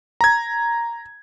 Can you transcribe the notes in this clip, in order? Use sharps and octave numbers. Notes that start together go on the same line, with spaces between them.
A#5 G#6